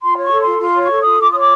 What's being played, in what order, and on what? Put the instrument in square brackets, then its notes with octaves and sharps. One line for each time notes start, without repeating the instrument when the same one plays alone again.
[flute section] F4 C6
C#5
C#6
A4
F4 C6
F4 C6
C#5
C#6
A4
F4 D#6
F4 D6
D#6
C#5 D6